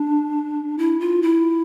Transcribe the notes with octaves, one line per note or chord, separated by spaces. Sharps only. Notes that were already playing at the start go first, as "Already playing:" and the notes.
Already playing: D4
E4
F4
E4